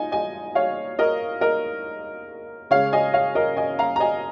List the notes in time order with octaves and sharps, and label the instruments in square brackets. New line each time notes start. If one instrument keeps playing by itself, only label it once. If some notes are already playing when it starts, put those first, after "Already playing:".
Already playing: [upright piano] D#4 F4 D#5 G#5
D#5 G#5
C#5 F5
A#4 D#5
A#4 D#5
C#3 G#3 C#4 C#5 F5
D#5 G#5
C#5 F5
A#4 D#5
D#5 G#5
F5 A#5
A#5
D#5 G#5